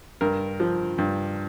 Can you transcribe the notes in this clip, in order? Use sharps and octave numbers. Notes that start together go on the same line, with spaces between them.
G2 A#4
F3
G2